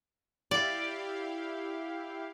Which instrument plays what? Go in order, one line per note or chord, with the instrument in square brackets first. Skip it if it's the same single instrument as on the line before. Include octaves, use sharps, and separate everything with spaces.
[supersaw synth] E4 G4 F5 [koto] D5